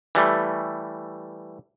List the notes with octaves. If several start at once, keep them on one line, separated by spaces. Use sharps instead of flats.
E3 G3 A3